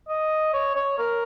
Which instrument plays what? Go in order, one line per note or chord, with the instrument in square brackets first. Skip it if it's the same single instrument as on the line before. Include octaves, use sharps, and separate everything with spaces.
[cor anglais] D#5
C#5
C#5
A#4